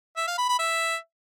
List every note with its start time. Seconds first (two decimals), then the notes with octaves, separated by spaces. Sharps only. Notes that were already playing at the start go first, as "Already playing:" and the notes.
0.17 E5
0.27 F5
0.38 B5
0.49 B5
0.59 E5